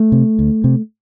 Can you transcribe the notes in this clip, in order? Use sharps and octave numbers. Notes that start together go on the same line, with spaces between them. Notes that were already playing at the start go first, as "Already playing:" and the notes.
Already playing: A3
C3
D2
C3